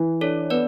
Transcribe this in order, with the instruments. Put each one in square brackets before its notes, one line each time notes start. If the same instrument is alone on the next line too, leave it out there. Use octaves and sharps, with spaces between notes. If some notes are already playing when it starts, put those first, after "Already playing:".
Already playing: [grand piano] E3
[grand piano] D4 [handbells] A4 C#5
[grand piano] B3 [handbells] B4 D5